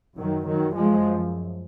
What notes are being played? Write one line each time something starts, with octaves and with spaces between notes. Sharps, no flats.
F#2 D#3 F#3
D#3 F#3
F#2 F3 G#3